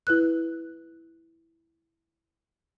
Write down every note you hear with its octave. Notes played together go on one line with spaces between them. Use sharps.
E4 B4 F#6